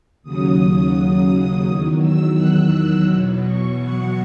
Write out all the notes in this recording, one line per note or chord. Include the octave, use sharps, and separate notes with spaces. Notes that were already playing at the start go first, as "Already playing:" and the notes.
D#2 C#3 F#3 D#6
E2 D#3 F#3
E6
F#6
E6
E2 B2 F#3
C#6
F#5